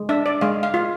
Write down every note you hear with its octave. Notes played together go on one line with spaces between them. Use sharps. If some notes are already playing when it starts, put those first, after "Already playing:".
Already playing: G#3
D4 E5
D5
G#3 F5
F5
F4